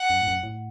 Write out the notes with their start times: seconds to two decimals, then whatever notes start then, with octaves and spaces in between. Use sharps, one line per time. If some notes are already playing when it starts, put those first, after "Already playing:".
Already playing: F#5
0.10 F#2
0.21 A2
0.27 F#2
0.43 A2